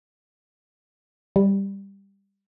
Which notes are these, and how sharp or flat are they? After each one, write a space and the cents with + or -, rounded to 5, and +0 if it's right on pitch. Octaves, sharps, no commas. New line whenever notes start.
G3 +10